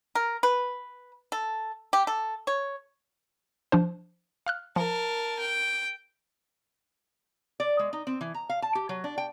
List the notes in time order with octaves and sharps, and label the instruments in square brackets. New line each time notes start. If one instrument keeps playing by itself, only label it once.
[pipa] A#4
B4
A4
G4
A4
C#5
[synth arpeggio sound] F3 D4 C5
F5 F6 F#6
[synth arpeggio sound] F3 [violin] A#4 A5
[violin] G5
[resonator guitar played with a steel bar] D5
G#3
D#4
C4
E3
A#5
F5
A5
G4
F#3
D4
G5